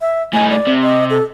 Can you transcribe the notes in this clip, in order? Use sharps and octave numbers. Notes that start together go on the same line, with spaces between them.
E5
A2 D#4 G#5
D5
C3
D#5
A4